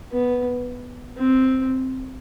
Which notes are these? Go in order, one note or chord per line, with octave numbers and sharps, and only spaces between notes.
B3
C4